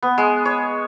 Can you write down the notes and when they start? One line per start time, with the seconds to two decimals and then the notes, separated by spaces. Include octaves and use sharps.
0.03 B3
0.18 G#3
0.45 C#5